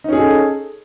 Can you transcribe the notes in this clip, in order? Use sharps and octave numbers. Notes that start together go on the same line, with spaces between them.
C#4 D#4 G#4 A4